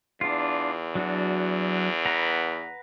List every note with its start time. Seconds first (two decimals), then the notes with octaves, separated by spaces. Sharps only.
0.21 E2 D4 F4
0.95 F#3 D4 F#4
2.05 B4 F#5 A#5